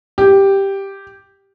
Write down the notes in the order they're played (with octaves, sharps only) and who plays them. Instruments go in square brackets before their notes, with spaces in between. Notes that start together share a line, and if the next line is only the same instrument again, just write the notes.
[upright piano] G4